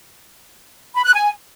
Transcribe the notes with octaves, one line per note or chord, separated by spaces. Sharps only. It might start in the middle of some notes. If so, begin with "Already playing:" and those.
B5
F#6
G#5